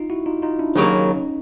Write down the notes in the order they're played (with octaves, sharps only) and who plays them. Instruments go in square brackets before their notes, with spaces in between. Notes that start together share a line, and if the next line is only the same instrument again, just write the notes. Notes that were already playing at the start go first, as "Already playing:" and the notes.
Already playing: [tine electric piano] D#4 F4
E4 F#4
D#4 F4
D#4 F4
D4 E4
[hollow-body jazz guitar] D#2 C#3 F#3 A#3 [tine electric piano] C#4 D#4